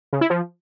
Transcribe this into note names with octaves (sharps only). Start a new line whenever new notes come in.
C#3
E4
F3